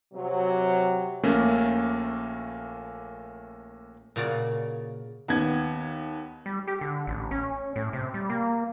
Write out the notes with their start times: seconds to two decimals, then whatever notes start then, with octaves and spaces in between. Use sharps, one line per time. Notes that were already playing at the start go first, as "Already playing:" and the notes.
0.14 C3 F#3
1.24 A#1 A3 A#3 C#4
4.16 A#2 C#3 F#4 D5
5.28 D#2 B3 G#6
6.46 G3
6.68 G4
6.81 D3
7.07 A1
7.31 C#4
7.76 A2
7.93 C3
8.14 G3
8.30 A#3